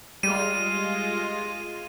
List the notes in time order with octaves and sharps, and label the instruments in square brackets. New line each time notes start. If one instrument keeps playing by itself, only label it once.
[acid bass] G3 [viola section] G#3 F4 [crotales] D#7